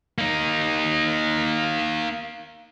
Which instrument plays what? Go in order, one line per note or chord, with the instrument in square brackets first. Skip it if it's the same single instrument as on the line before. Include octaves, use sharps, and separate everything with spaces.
[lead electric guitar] A#3 D#4